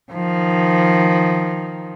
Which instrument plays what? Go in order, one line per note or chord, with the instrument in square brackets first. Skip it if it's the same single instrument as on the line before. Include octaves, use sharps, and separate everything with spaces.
[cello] D#3 F3